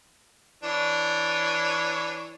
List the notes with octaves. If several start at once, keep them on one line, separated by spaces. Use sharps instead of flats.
E3 D4 C#5